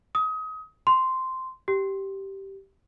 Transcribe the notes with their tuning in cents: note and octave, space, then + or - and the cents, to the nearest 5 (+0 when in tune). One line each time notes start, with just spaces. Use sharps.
D#6 +30
C6 -5
G4 -10